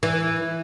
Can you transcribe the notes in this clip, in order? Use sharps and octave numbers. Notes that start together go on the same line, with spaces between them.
E3